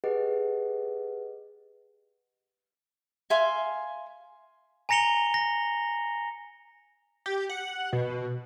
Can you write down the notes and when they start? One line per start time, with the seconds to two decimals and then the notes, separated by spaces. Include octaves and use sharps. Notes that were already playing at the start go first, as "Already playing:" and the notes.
0.04 G4 G#4 B4 D#5 F#5
3.30 E5 F5 G#5 C6
4.89 G#5 A#5 A#6 C#7 F7 G7
5.34 A#6
7.26 G4
7.50 F#5
7.93 B2